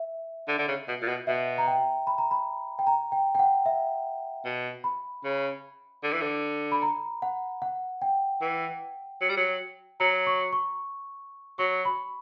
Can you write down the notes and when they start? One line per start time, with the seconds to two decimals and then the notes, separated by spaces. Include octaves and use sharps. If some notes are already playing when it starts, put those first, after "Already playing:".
Already playing: E5
0.48 D3
0.59 D3
0.68 C#3
0.88 B2
1.02 A#2
1.08 B2
1.27 B2 E5
1.58 A#5
1.67 G5
2.07 B5
2.18 A#5
2.31 B5
2.79 G5
2.87 A#5
3.12 G5
3.35 G5
3.39 F#5
3.66 E5
4.45 B2
4.84 B5
5.24 C#3
6.03 D3
6.12 E3
6.21 D3
6.72 B5
6.82 A#5
7.22 F#5
7.62 F#5
8.02 G5
8.42 E3
9.21 F#3
9.29 G3
9.37 F#3
10.00 F#3 A#5
10.27 C#6
10.53 C#6
11.59 F#3 C#6
11.85 B5